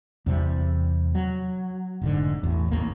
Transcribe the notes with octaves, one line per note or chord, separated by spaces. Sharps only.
E2 C3 G3
F#3
F1 G#2 D3
A1 E2
A1 D#2 G#2 A#3